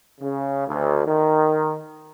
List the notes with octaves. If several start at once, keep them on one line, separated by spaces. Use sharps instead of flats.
C#3
D2
D#3